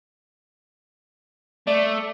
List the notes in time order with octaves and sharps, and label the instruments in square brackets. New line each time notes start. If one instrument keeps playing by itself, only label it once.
[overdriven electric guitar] A3 [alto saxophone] D5